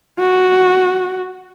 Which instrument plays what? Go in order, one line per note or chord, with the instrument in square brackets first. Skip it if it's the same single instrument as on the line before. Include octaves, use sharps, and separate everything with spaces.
[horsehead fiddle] F#4